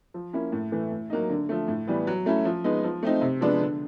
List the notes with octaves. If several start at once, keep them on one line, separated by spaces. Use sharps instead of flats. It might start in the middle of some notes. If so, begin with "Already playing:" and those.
F3
A#3 C#4 E4
A2
E3 A3
A2
F#3 A#3 D#4
D3
F3 A3
A2
E3 G3 B3
F#3
A3 C#4 E4
F3
G#3 B3 D#4
F3
A3 C4 D#4
C3
F3 G#3 B3 D4
D3